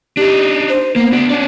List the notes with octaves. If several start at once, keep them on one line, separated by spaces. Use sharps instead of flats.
D4 D#4 G4
C5
A#3 B3
D4 F#4
C#4 D5